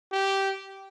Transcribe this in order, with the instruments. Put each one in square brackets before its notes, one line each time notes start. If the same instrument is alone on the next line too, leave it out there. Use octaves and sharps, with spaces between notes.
[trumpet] G4